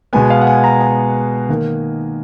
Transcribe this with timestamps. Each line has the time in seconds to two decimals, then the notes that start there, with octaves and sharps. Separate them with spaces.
0.13 B2 G#3 B3 G#5
0.30 F5
0.41 F#5
0.47 G#5
0.64 A#5
0.81 G#5
1.49 D#3 A#3